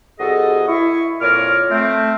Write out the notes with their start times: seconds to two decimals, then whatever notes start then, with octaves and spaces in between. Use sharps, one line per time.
0.19 C2 F#4 G#4 A4 D#5
0.68 E4 C#6
1.21 F2 A#2 A#4 C#5 D6 F6
1.70 A3 C4